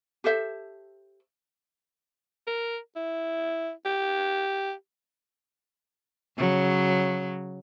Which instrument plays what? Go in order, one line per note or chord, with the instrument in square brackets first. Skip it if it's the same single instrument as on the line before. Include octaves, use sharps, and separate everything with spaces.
[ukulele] G4 A4 C5 E5
[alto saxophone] A#4
E4
G4
[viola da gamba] C#3 F#3